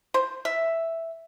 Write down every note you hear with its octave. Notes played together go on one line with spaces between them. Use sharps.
C5
E5